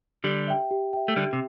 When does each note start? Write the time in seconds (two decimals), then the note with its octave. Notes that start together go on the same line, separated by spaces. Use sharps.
0.24 D3 G3 G4
0.47 E5 G5
0.71 G4
0.93 E5 G5
1.08 A3
1.16 D3 G3 G4
1.33 C3